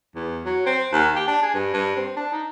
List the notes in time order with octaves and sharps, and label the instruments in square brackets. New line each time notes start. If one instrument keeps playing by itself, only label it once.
[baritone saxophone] E2
F#3
C4
D#2
G4
D4
G#4
G2
G2
C4
D4
D#4